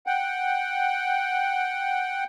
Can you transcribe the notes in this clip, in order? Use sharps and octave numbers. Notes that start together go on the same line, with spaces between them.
F#5 G5